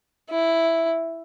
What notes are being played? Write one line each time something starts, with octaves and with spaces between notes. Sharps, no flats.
E4